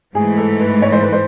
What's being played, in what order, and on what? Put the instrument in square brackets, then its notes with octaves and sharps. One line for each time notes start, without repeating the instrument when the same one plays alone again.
[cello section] G#2 E3 A3 [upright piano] G#4
[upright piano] A4
B4
C#5
C5
B4
C5